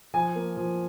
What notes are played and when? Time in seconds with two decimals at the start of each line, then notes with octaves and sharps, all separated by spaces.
0.14 F3 G#5
0.35 A#3
0.57 F3